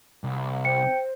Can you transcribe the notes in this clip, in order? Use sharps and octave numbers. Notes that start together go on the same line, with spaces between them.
C2
C5 G5 C#7